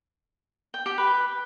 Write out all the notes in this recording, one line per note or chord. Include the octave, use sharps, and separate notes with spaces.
G5
G4
B4